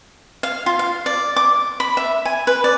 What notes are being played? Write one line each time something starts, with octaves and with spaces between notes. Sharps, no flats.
F5
F4
F5
D5
D6
B5
E5
G#5
B4
D5